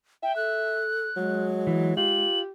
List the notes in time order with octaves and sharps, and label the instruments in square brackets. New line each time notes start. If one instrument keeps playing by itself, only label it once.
[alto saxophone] E5 [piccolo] G5
[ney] A4 [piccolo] F#6
[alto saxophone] F#3 [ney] G#3
[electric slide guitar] E3
[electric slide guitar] F4 [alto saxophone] G4 [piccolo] F#7